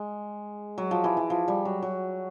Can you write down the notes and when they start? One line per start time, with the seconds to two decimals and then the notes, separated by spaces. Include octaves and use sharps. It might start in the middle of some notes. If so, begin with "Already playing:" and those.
Already playing: G#3
0.78 F#3
0.91 F3
1.04 E3
1.17 E3
1.30 F3
1.48 G3
1.65 F#3
1.82 F#3